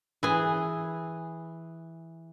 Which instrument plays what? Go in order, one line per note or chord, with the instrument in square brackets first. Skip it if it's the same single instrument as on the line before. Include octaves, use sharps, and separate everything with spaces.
[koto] E3 G#4